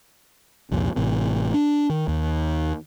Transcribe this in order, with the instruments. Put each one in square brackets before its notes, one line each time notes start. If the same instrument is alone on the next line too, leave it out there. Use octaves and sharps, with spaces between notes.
[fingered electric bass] C2 F2 A#2
A1 A2 C3
D4
D#3
D#2